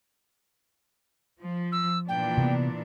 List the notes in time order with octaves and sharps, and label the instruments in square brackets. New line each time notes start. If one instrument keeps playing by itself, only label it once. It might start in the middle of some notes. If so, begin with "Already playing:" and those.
[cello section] F3
[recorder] E6
[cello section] A#2 E3 D4 [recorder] G5
[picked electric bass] C3 A#3 B3